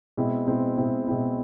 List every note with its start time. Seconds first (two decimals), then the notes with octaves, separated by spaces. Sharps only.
0.17 B2 G#3 C4 E4
0.47 B2 G#3 C4 E4
0.77 B2 G#3 C4 E4
1.07 B2 G#3 C4 E4